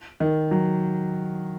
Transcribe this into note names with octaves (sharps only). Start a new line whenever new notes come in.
D#3
F#3